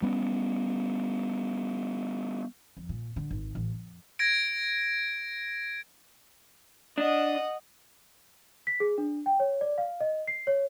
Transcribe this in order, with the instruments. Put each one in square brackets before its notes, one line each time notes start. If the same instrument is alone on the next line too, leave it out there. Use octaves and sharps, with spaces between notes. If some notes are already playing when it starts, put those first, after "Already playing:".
[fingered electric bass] G3 B3 C#4
[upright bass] F2
A#2
D3
G#1
A1
F2
[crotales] G#6 A#6 D7
[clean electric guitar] D4 [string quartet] D#5 F#5 D#6
[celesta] B6
G#4
D4
G5
C#5
D5
F5
D#5
C7
C#5